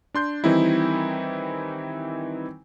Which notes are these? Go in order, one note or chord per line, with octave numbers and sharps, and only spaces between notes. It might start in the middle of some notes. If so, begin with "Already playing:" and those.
D4 C6 G6
D#3 E3 G3 C4 D#4 E4